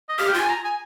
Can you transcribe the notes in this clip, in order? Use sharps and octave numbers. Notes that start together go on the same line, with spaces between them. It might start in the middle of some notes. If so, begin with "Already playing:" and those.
D#5
G4 F5
G5
F4
G#5
A#5
G#5